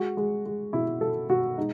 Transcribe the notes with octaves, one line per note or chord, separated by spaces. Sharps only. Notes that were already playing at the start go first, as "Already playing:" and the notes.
Already playing: G#3 F#4
G#3
G#3
B2 E4
B2 A4
B2 F#4
G#3 D#4